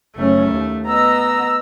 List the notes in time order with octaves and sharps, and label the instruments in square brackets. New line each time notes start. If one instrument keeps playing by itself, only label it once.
[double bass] F#1 C#4 [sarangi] A3
[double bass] D#2
[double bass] B3 [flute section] D#5 E6 [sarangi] A#5